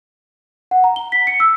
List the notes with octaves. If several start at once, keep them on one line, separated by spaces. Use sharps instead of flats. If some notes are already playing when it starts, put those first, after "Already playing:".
F#5
A#5
G7
B6
C#7
E6